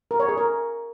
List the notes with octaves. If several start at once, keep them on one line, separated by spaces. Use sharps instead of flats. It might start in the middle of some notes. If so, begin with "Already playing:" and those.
A#4
C#5
G#4
A#4